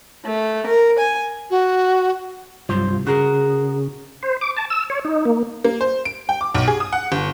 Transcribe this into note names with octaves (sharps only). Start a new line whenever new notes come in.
A3
A#4
G#5
F#4
C2 G2 C3 F#3 G3 F4 C5
C#3 C#4 F#4 G#4 A#4
C5
D6
A5
E6
C#5
D#4
A#3
A#3
C5
D7
G5
D6
B1
G#4
D#6
F#5
G1